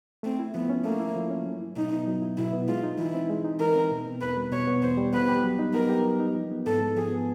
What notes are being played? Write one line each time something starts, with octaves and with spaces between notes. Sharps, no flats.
A3 C4
E4
F3 B3
C#4
A3 A#3
E4
F3
C#4
F#3
E4
B2 D#4
B3
F#3
E4
B2 E4
B3
G#3 F4
D#4
E3 E4
C4
G#3
D#4
E3 A#4
C4
B2
B3
E2 B4
G3
B2 C#5
B3
E2 C5
G3
B3 B4
G4
F#3
D#4
B3 A#4
G4
F#3
D#4
F3
B3
G#2 A4
G#3
F3 G#4
B3